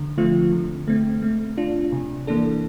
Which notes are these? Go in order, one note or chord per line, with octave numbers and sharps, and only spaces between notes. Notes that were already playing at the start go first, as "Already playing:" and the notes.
Already playing: D3
F3 A3 C4 F4
D3
A3 C4
A3
D4 F4
C3
E3 A#3 D4 A4